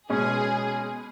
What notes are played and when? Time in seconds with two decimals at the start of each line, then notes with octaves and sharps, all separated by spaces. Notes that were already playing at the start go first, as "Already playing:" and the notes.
0.10 B2 G#3 C#4 G#4